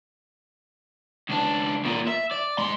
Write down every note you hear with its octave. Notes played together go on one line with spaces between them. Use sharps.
C#2 D4
E2 A#2
E5
D5
G#2 C6